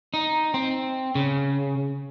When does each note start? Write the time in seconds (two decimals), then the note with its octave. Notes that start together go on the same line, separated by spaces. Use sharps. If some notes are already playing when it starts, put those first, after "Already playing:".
0.14 D#4
0.54 C4
1.15 C#3